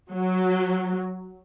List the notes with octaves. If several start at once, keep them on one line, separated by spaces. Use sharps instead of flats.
F#3